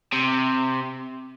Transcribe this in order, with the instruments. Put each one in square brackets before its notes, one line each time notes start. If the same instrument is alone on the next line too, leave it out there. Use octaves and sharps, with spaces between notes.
[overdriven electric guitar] C3